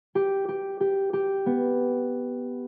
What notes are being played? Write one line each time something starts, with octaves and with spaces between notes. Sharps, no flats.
G4
G4
G4
G4
B3